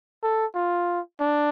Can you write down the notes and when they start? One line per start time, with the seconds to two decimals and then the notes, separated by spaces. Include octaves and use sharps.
0.23 A4
0.55 F4
1.20 D4